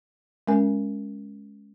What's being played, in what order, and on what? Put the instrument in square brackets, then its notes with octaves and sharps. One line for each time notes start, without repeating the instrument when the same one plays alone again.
[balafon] G#3 C#4 A#4 G#5